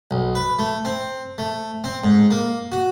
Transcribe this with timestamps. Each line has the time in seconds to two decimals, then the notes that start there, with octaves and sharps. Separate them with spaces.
0.11 B1
0.35 B4
0.59 A3
0.85 C4
1.38 A3
1.84 C4
2.04 G#2
2.31 A#3
2.72 F#4